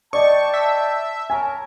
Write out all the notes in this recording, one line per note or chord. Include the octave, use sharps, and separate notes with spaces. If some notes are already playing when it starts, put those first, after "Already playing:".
D5 D#5 G5 A5 C#6
E5
A#4 C#5 G#5 A5